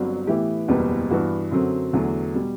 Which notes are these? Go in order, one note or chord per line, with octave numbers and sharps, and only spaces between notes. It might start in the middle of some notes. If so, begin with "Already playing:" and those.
Already playing: G1 G2 F#3 C4 F#4
A2 E3 B3 E4 G4
F#1 E2 B2 G3 B3
G2 E3 B3 F#4
F#2 D3 F#3 C4
E2 D3 F#3 A3
B2 G3